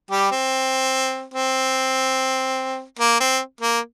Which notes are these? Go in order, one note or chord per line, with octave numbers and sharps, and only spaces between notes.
G3 G4
C4
C4
A#3
C4
A#3